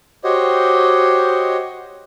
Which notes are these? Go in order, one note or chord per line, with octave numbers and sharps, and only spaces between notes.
F#4 G4 C5 C#5 D#5